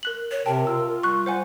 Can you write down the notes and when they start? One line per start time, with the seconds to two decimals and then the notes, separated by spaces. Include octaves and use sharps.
0.03 A#4 F#6 F#7
0.31 C#5
0.46 C3 A#4 G5 A5
0.67 F4 E6
1.03 G3 C#6 F#6
1.26 G3 C5 F#5 G#5